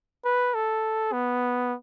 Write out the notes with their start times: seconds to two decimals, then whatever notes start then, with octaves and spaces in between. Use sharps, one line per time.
0.25 B4
0.54 A4
1.13 B3